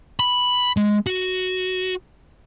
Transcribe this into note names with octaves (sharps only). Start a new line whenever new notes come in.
B5
G#3
F#4